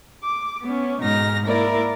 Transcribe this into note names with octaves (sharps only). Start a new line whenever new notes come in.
D6
B3 C#4
G#2 B2 D#4 F6 A#6
A#3 E4 A#4 D5